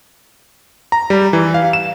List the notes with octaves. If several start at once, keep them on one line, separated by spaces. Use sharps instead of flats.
A#5
G3
E3
F5
E7